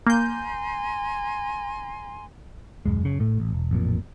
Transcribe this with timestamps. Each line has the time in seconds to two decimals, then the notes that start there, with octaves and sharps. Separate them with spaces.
0.07 A#3 G#5 A#5 C6 G6
2.86 D#1 F#2 G#3
3.02 F#1 C#3
3.20 A2 A3
3.40 A1
3.53 E1
3.71 A1 F2 A#2